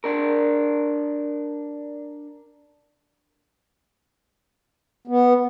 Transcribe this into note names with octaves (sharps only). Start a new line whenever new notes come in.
D4 A#4
B3